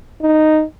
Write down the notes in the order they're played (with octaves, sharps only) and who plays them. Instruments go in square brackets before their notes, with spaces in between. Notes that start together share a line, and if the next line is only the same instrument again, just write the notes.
[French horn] D#4